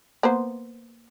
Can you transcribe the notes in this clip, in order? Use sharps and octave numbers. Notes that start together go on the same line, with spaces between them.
A#3 B3 C5